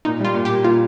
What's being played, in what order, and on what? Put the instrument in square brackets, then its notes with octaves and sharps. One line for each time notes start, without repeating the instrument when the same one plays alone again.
[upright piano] A#2 [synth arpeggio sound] D#4
[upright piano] G3 [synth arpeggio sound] F4
[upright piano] A#2
[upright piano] A#3 [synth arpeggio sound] G4
[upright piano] A#2 [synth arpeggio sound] F4